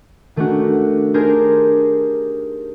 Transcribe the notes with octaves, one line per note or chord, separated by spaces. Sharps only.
D#3 A3 C#4 D4 F#4
D4 D#4 G4 G#4 A#4 C5